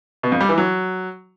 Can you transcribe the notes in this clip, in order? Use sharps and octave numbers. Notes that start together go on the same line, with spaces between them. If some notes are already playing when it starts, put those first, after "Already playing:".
B2
F2
G3
E3
F#3